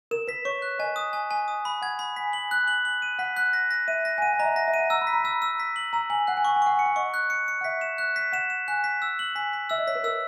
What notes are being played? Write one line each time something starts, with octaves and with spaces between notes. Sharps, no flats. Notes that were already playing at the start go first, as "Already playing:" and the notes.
A#4 E7
B4 B6
C#5 C#6
F#6
D#5 G#5
D#6
G#5
G#5
D#6
B5
F#5 G#6
B5
G#5 B6
F#7
F#6
F#7
F#7
D#7
F#5 B6
F#6
A#6
A#6
E5 D#7
A#6
G#5
F#5 D#7
G#5
D#5 A#5
E5
F#5 A#6
E5
D#7
F#5
A#5 E6
B5
B6
A#5
B5 E6
E6
B6
F#7
A#5 E6
G#5 F#7
F#5 F#6
G#5
F#5 C#6
G#5
F#5 C#6
G#5 C#7
F#5
D#5 C#6
F#6
C#7
C#7
F#5
E5 B6
E7
F#6
B6
F#5 E7
E7
G#5 F#6
B6
E6
F#7
G#5 B6
B6
E5 E6
D#5
C#5 B6
B4
A#4 E6